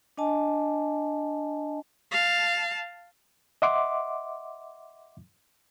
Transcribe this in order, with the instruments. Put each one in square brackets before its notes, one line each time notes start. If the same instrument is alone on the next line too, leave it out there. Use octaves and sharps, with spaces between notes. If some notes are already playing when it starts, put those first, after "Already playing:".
[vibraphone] D4 D#5 G#5 A5
[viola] F5 A5
[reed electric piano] D#5 E5 F#5 C6 D6